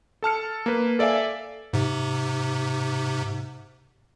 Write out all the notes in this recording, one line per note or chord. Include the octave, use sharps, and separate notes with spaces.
A4 A5 F6 C#7
A#3 B4
A4 D5 E5 F5 G#5
G#2 C3